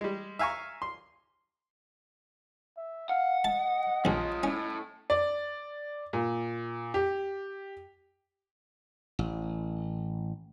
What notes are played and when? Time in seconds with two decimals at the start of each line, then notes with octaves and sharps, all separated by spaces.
0.01 G3 G#3
0.39 E5 F5 G#5 A#5 C#6
0.82 C6
2.77 E5
3.09 F5 F#5
3.44 D#5 A5
4.05 A#1 D#2 F4 C#5
4.43 A2 C#4
5.10 D5
6.13 A#2
6.94 G4
9.19 A1